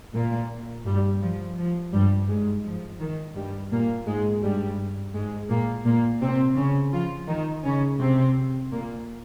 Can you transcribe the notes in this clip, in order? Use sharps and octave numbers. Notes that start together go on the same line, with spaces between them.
A#2 A#3
G2 G3
F3
F3
G2 G3
G#2 G#3
F3
D#3
G2 G3
A#2 A#3
G#2 G#3
G2 G3
G#2 G#3
A#2 A#3
A#2 A#3
C3 C4
C#3 C#4
F3 F4
D#3 D#4
C#3 C#4
C3 C4
A#2 A#3